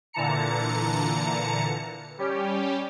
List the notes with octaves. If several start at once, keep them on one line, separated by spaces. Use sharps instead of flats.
A#2 D3 E3 A5 A#5 C#7
G3 C#4 G4